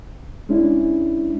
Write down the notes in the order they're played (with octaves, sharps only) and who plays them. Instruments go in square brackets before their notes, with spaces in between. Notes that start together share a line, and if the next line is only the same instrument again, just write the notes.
[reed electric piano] G#3 C#4 D4 E4